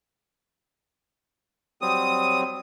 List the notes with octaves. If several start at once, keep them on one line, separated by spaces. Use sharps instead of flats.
F#3 G3 C4 D#6